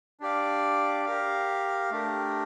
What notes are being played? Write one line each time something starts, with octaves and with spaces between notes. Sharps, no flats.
D4 G4 D5 F5
G4 A#4 F5
A3 D4 G4 A#4